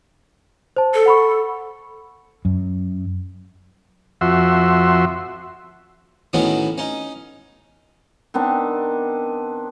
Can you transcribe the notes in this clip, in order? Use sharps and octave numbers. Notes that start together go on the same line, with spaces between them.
C5 A5
A4
F#5 B5 C#6
F#2
F2 F#4 E5 C6
A2 D#3 F#3 B3 C#4
C#4 D#4
D#3 B3 C4 D4